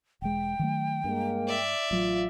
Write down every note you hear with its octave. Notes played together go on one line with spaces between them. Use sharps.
E1 G#3 G5
D#3 F#3 A3
G2 G#3 A#3
D5 E5
A1 F#3 F4